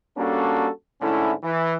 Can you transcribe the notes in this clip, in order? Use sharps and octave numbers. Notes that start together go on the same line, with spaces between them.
G3 A#3 C#4 D4 F#4 A4
G#2 D3 A3 C#4 E4
E3